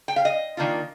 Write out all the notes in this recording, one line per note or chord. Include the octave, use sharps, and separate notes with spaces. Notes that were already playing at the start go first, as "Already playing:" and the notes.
G5
F5
D#5
D#3 A#3 D4 F4